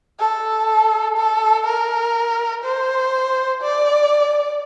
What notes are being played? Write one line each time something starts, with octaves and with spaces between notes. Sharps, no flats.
A4
A4
A#4
C5
D5